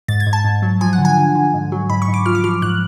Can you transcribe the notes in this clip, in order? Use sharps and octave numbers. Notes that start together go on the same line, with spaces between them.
G#2 A6
G#6
G#2
A5
G#2
F#3
F3 G#5
F#5
D3
G#5
D3
D3
G#2
F#3
G#2 B5
C#6
G#2
D6
F3 F6
D6
F3 F6
G#2 F#6